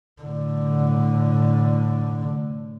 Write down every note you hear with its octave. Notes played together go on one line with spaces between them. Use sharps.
A2 D3